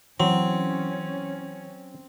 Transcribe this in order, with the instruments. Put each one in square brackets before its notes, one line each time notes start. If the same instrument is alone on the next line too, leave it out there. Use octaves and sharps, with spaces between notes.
[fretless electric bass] E3 [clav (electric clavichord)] F#3 [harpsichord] C4 [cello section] C#4